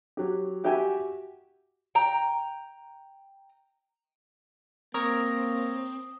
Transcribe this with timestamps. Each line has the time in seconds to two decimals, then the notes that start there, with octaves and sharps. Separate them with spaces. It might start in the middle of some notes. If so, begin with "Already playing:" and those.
0.17 F#3 G4
0.64 F#4 G4 E5 G5 G#5
1.95 G5 A#5
4.94 A#3 C4 A#4 C#5 A#5 D#6